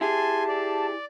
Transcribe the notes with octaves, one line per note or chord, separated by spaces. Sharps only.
E4 G4 G#4 G#5 A5 C6
D5